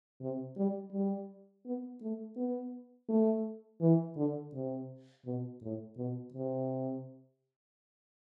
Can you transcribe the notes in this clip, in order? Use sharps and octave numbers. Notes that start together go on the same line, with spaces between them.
C3
G3
G3
B3
A3
B3
A3
E3
D3
C3
B2
A2
B2
C3